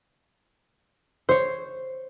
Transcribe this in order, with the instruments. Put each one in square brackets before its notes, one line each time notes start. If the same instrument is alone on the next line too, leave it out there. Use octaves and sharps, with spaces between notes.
[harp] C5 C#5